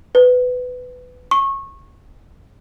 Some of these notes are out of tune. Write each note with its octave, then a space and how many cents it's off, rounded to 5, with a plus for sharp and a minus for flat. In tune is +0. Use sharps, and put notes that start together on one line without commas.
B4 +20
C#6 -25